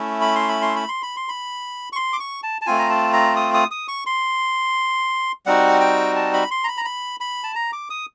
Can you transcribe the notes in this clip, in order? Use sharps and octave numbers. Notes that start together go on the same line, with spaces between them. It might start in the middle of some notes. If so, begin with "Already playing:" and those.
Already playing: A3 C#4 E4
B5
C6
B5
C6
B5
C6
B5
C6
B5
C#6
C6
D6
C#6
A5
A5
A3 C4 F4 G#5
A#5
A5
A#5
D#6
D#6
D#6
C#6
C6
G3 C4 D#4 F#4 F#5
G5
A5
B5
C6
A#5
B5
A#5
B5
B5
A5
A#5
D6
D#6